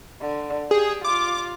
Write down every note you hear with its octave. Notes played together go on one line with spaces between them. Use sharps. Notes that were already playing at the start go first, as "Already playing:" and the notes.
D3
G4 G#4
F4 D6